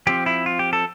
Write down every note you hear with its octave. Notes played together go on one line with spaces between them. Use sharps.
F3 C4 G4
E4
F4
G4
A4